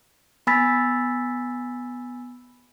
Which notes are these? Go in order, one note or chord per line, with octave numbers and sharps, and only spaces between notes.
B3 G#5 B5 E6 A6 B6